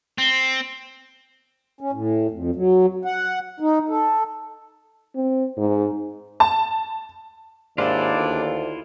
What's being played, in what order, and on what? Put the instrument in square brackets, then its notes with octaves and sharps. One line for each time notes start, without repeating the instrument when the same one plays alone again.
[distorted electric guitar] C4
[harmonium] C#4
A2
F2
F#3
F#5
D#4
A4
[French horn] C4
G#2
[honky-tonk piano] A5
[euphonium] D#2 [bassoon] G#2 [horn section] D4 D5 [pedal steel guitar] E4 F4
[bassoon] D2